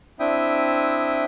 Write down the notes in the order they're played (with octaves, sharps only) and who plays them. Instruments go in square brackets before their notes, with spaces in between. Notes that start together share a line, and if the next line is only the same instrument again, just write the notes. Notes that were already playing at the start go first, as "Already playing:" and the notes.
[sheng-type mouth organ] C4 D4 E4 E5 G5 D#6